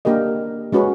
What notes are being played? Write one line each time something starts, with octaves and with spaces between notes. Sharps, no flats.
A#3 D4 G4 A#4 D#5
G#3 C#4 F#4 B4